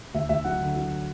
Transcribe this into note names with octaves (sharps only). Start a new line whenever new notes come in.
D2 E5
D2 E5
F#3 F#5
D3
F#3